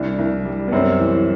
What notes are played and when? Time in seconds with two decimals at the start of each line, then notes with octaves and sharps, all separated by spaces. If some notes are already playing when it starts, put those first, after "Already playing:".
Already playing: C2 D4
0.19 C2
0.45 G3
0.68 B3
0.72 F#2 C4
1.00 E3